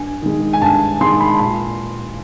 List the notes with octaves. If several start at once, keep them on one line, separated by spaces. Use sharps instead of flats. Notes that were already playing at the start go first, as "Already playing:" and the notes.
Already playing: G2 G#5
D#3 G#3
G#5
G2 A5
D#3 G#3 C6
B5
A#2 C6